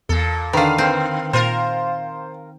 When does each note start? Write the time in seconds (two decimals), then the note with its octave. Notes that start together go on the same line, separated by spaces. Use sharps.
0.09 E2 A#2 A4
0.53 D3 D#3 B4 F5
0.78 D3 C4
1.33 A#2 F4 A#4 C5